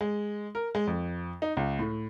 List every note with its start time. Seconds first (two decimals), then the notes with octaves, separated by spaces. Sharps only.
0.01 G#3
0.55 A#4
0.75 G#3
0.87 F2
1.42 D#4
1.57 C#2
1.79 A2